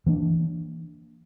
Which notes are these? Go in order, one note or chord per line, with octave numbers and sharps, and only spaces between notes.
E3 A#3 D4